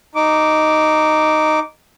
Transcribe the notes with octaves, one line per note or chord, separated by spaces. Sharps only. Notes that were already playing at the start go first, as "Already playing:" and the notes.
D#4 D6